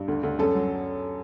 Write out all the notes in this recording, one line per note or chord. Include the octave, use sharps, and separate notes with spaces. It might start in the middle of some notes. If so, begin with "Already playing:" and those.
Already playing: G2
D2
D2
F#2 A4
F#3